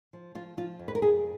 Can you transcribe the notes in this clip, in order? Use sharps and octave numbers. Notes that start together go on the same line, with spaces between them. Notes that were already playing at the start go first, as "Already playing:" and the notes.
F3
F3 F4
F3 F4
F2
B4
A#4
F2 G#4